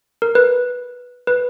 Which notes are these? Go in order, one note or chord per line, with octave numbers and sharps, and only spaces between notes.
A#4
B4
B4